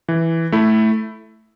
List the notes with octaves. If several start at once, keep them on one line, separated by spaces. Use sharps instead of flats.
E3
A3 E4